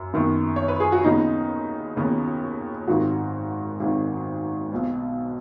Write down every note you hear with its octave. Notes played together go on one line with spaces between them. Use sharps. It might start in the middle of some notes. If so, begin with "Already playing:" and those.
Already playing: F#2
F#2 D#3 B3
C#5
B4
G#4
F#4
D#2 C#3 B3 D#4
D#2 C#3 B3
G#1 G#2 D#3 F#4
G#1 G#2 D#3
B1 B2 B3